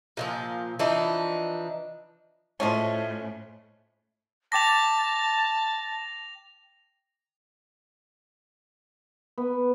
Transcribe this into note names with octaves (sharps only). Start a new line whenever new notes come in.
A#2 D#3 F3
E3 F3 D4 D#4
A2 F3 G#3 C#4
G5 A5 D6 A#6 B6 F7
B3